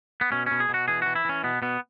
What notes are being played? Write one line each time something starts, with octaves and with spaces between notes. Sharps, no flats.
B3
B2 C#4
B2 C#4
G#4
B2
F#4
E3 G#4
E3 F#4
E4
E3 C#4
B2 B3
B2 B3